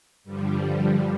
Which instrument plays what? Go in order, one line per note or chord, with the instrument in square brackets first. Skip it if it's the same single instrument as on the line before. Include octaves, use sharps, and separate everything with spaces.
[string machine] G2 D3 F3 G3